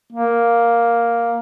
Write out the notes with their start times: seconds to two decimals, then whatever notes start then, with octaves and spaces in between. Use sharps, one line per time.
0.12 A#3